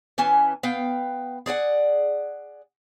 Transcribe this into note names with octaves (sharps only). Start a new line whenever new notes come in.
E3 C#4 G#5 A5
B3 F5 G5
G#4 D5 D#5 F#5